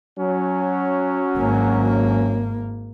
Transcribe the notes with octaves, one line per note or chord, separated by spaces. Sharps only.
F#3 C#4
G#1 A#3